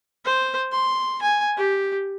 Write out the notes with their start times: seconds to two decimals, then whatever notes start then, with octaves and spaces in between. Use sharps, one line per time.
0.25 C5
0.72 C6
1.22 G#5
1.57 G4